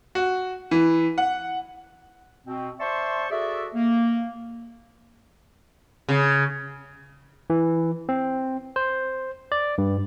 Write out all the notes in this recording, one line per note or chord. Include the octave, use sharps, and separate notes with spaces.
F#4
E3
F#5
B2 C4
C5 D5 E5 A5 C6 C#6
F#4 G#4 A4 D5 E5
A#3
C#3
E3
C4
C5
D5
G2